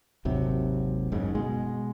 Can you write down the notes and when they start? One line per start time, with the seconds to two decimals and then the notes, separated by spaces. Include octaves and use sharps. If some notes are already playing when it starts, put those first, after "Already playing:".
0.25 G#1 D#2 C3 F#3
1.12 F#1 G#2 C#3
1.35 B2 G#3